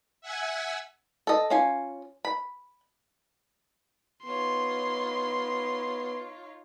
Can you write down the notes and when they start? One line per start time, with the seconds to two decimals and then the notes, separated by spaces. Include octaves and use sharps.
0.21 E5 F#5 G#5 E6
1.27 A4 D#5
1.50 C#4 F4 G#5
2.25 B5
4.25 B3 D#4 F4 C#5 C6